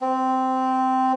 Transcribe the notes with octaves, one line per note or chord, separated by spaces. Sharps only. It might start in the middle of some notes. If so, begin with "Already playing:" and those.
C4